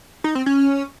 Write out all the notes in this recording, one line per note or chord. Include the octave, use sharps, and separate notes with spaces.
D#4
C4
C#4